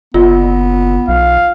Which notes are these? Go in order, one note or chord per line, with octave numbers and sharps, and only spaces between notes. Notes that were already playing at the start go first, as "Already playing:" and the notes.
F#1 B3 F4
B1 F5